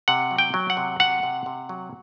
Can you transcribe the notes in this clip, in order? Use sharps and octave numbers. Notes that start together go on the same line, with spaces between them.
C3 F#5
F#3
G5
F#3
F#5
C3
C3 F#5
C3
C3
F#3